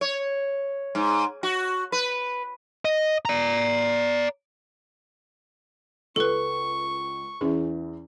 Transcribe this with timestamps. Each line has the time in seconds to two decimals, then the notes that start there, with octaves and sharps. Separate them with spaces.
0.01 C#5
0.95 G#2
1.43 F#4
1.92 B4
2.85 D#5
3.25 D5 A#5
6.16 C#2 A4 B4 C#6
7.41 E2 E3 C#4 G#4